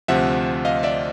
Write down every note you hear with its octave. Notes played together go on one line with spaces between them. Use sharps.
D2 C3 F3 E5 F#5
D#5 F5
D5 E5